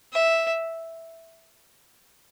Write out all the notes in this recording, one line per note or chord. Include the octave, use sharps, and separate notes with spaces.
E5